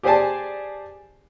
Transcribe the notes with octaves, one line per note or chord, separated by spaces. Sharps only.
G4 G#4 C5 D5 G#5 A5